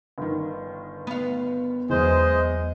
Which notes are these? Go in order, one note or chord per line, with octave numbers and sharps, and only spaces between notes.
G1 D#3
B3 F5
E2 E3 F#3 G#3 C5 D#5